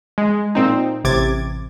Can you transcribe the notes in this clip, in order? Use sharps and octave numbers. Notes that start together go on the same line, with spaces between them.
G#3
A#2 C4 D#4
A1 C3 D6 G#6 A6